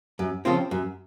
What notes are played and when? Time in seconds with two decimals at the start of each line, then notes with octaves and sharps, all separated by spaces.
0.19 F#2
0.45 C#3 F3 C4 F4
0.71 F#2